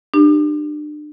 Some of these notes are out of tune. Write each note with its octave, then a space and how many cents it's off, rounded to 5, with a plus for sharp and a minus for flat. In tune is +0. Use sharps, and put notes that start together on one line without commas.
D4 +35 G4 +0